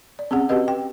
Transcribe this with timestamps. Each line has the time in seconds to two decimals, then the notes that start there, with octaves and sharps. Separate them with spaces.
0.19 D5
0.31 C4 C#4 G#4 F#5
0.49 C4 F#4 G4 B4 D#5
0.68 G5